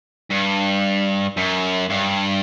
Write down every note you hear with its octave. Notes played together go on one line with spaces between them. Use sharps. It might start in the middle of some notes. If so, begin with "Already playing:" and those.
G2
F#2
G2